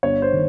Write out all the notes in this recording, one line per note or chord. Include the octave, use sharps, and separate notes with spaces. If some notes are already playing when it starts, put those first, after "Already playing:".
G1 C#5
C5
D#3